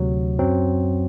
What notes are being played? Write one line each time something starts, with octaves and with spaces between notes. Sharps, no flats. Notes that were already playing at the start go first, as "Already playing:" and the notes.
Already playing: D2 C3 F#3
F#2 F#3 C4